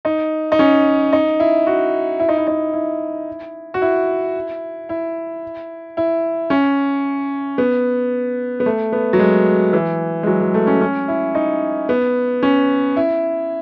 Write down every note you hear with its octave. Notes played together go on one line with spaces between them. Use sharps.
D#4
D#4
C#4
D#4
E4
F#4
E4
D#4
E4
D#4
E4
F#4
E4
E4
E4
C#4
B3
B3
A3
B3
F#3
G#3
E3
G#3
F#3
G#3
A3
C#4
C#4
E4
D#4
B3
C#4
E4